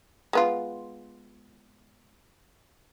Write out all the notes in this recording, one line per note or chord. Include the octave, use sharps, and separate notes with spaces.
G#3 B3 F4